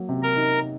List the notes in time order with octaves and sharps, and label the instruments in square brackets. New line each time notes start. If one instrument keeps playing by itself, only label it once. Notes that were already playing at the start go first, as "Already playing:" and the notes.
Already playing: [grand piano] F#3 A#3
C3
[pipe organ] A#4
[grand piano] D#4